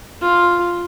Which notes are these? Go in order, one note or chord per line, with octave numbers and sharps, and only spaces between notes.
F4